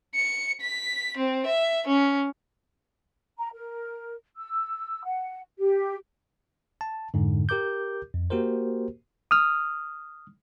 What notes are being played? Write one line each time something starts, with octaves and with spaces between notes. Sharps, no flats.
C#7
B6
C4
E5
C#4
A#5
A#4
E6
F#5
G4
A5
F2 G#2 D3
G4 A#4 D6 G6
F2
A#3 F#4 G4 A#4 C5
D#6 F6